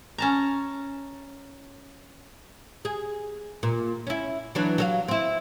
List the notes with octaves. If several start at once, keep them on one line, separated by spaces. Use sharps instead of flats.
C#4 A5 A#5
G#4
A#2
C#4 E4
E3 F#3 D4
F#3 A4 F5
C4 E4